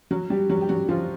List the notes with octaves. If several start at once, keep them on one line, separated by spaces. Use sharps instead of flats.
F#3 F#4
G3 G4
F#3 F#4
G4
F#3 F#4
F3 F4